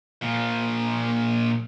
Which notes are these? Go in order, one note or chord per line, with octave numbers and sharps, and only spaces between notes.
A#2 F3